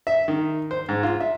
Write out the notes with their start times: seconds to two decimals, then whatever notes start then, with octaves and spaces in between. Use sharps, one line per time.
0.07 E5
0.28 D#3
0.71 C5
0.89 G#2
1.03 F4
1.20 E5